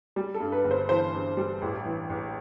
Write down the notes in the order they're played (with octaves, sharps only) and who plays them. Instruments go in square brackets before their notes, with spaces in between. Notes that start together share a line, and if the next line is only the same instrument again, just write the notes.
[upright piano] G3
A4
G2
B4
G1
C5
E3 C5
G2
G3
A1
E3
A1